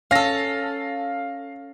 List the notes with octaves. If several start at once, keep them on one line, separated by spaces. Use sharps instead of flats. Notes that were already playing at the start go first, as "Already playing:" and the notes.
C#4 A4 F5 A#6